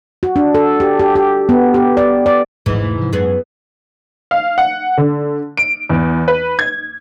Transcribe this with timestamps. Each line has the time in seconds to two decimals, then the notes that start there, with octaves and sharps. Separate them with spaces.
0.23 F#4
0.36 D4
0.55 A4
0.80 G4
0.99 G4
1.15 G4
1.49 B3
1.74 G4
1.97 D5
2.26 D5
2.66 D1 A1 G#2 E3 F3
2.80 E1 A3
2.97 C3 F3
3.13 F#2 E3 B3 G#4
4.31 F5
4.58 F#5
4.97 D3
5.57 D7
5.90 E2
6.28 B4
6.59 G#6